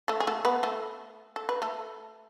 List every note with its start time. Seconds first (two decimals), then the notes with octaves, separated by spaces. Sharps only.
0.08 A3 A4
0.20 G#4
0.27 A3 A4
0.45 B3 B4
0.63 A3 A4
1.36 A4
1.49 B4
1.62 A3 A4